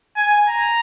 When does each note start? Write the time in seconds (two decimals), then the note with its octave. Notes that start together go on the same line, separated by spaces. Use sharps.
0.17 G#5
0.48 A#5